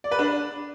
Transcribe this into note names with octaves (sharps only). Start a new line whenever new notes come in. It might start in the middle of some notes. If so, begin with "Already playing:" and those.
D5
B4
D4